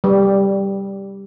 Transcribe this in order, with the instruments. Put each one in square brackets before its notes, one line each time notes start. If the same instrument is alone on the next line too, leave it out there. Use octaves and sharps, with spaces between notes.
[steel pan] G3